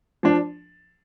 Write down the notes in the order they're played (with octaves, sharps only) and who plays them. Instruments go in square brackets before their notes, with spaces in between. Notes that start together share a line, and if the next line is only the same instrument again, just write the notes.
[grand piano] F3 D4